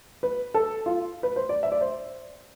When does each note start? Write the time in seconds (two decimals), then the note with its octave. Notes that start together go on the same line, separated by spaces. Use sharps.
0.23 B4
0.54 A4
0.86 F4
1.23 B4
1.36 C5
1.49 D5
1.63 E5
1.72 D5
1.81 C5